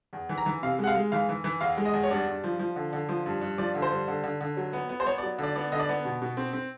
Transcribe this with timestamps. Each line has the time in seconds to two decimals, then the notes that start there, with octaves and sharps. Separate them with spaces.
0.13 E2
0.29 E3
0.38 A#5
0.46 E3
0.63 C3 F5
0.79 G#3
0.84 F#5
0.87 F5
0.95 G#3
1.12 E3 F5
1.29 E3
1.44 E3
1.61 E2 F5
1.77 G#3
1.85 D#5
1.93 E2
2.04 C#5
2.10 G2 D5
2.27 G2
2.44 F3
2.59 F3
2.76 D3
2.93 D3
3.09 F3
3.26 G2
3.41 G2
3.58 F3 D5
3.75 D3
3.82 C5
3.91 G2
4.08 D3
4.24 D3
4.41 D3
4.57 F#3
4.73 B3
4.89 B3
5.00 C5
5.06 B3 C#5
5.18 D5
5.23 F#3
5.38 D3 D5
5.56 B3 D5
5.72 D3 D#5
5.80 D5
5.89 B3
6.05 B2
6.22 B2
6.37 C4
6.53 C4